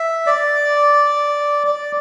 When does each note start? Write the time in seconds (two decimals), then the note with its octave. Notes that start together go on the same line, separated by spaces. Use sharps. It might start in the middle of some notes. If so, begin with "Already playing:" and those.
Already playing: E5
0.26 D5
1.67 D5